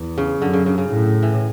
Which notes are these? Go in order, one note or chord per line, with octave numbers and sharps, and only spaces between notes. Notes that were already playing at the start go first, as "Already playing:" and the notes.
Already playing: E2
C#3
F#2 D3
C#3
C#3
C#3
A2
E3